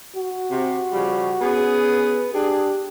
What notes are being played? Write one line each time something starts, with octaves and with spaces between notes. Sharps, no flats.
F#4
C3
C#3 F3 G3
B3 C#4 G#4
B4
D4 G4 G#4